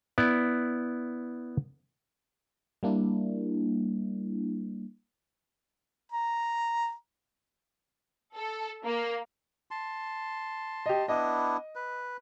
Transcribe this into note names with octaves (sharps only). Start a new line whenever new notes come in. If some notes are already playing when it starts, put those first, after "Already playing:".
B3 E4 D5
G3 A#3 D4 E4
A#5
A4
A#3
A5 C6
G4 D#5
B3 D4 E4 D#5
B4